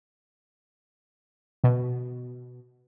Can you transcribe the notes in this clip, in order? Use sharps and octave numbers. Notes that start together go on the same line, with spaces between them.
B2